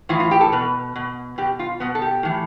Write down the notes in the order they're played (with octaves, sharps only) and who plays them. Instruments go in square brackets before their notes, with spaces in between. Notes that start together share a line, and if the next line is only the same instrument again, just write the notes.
[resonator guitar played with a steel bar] A2 E3 F4
F4
G4
A4
B2 B4
B2
B2 G4
F4
B2 B3
A4
G4
A2 E3